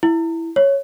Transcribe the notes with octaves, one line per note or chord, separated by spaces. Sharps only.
E4
C#5